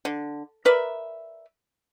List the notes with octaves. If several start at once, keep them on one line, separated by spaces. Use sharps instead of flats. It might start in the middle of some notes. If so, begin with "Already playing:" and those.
D3
A#4 B4 D5 E5